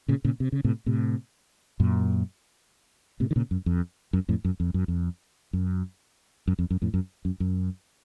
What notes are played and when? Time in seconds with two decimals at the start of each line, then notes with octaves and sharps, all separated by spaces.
0.08 A#2 C#3
0.25 A#2 C#3
0.40 C3
0.52 C#3
0.64 A2 C3
0.86 A2 C3
1.80 F#2 A#2
3.20 A2 C3
3.31 D#3
3.36 A#2 C#3
3.51 F#2
3.66 F2
4.13 F#2
4.29 F2 A2
4.45 F#2
4.60 F2
4.74 F#2
4.88 F2
5.53 F#2
6.48 F#2
6.59 F2
6.71 F#2
6.82 F2 A2
6.94 F#2
7.25 F#2
7.40 F#2